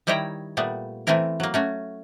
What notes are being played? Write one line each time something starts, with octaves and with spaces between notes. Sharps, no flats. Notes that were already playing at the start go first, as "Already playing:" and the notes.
D#3 G3 E4 C#5 G5 A#5
A#2 G3 A3 B3
E3 A3 C4 E4 A#4
F#3 A#3
A3 C#4 F#4